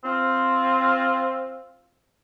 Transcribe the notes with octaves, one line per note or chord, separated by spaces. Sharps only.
C4 F4